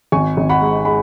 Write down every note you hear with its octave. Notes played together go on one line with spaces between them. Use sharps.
G#1 G#5 C#6
G#1
F#5 B5
G#2
G#3 F#5 B5